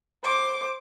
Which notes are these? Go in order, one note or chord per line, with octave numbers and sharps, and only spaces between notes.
C5 D6